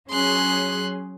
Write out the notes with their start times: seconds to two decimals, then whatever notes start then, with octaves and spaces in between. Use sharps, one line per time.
0.10 F#3 C#4 G#4 C6 F#6